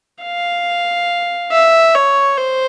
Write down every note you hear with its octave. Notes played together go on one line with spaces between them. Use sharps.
F5
E5
C#5
C5